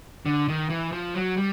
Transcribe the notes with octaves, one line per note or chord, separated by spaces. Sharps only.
D3
D#3
E3
F3
F#3
G3